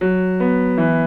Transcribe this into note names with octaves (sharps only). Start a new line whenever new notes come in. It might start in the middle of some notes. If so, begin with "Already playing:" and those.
F#3
B3
E3